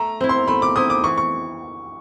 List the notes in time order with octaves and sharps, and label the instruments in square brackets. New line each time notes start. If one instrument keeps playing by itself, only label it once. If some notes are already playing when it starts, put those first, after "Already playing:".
Already playing: [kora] A3 [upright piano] A#5
[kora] C4 E4
[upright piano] C6
[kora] A3 [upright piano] B5
[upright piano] D6
[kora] C4 E4 [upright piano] D#6
[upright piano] D6
[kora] E3 [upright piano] C#6
[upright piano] C#6